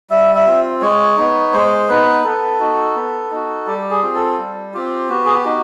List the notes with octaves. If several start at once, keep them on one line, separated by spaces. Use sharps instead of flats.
G3 E5
E5
C4 F4
G#3 C#5
B3 D#4
G#3 C5
B3 D#4 B4
B3 A4
D#4 F#4
B3
D#4 F#4
G3 G4
G#4
C4 F4
A4
G3
C4 F4 G4
B3 F#4
G#4
G4
D#4 F#4